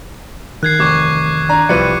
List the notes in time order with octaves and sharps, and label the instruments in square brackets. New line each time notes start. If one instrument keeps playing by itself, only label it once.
[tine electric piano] D#3 [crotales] F#6 G#6 C7
[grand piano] F1 [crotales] C#6 D6 G#6
[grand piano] D4 A#5
[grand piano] C2 B4 D5 [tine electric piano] F3 F4 G4 [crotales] C#7 D#7